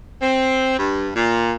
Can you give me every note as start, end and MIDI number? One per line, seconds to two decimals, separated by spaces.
0.22 0.79 60
0.79 1.09 43
1.15 1.54 46